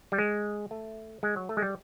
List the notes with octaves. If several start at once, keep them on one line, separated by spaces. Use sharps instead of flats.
G3
G#3
A3
G#3
F#3
A3
G#3
G3